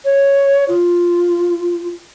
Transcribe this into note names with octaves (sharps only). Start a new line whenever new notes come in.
C#5
F4